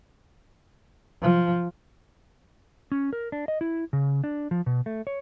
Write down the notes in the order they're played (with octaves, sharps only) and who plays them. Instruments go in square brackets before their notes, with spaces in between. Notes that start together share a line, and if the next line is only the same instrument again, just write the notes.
[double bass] F3
[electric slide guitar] C#4
A#4
D4
D#5
E4
C#3
D4
F3
B2
A3
C#5